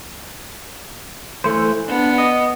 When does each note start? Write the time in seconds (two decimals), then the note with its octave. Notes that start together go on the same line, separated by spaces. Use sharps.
1.44 E3 A3 C5
1.88 B3 D4
2.18 D#5